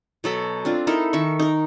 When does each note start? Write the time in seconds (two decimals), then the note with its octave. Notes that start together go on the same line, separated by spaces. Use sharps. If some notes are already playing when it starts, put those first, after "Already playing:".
0.24 B2 F#3 A4 B5
0.65 C4 D4 F4
0.87 D#4 E4 A4 A#4
1.13 D#3 E5 C#6
1.40 D#4 A#4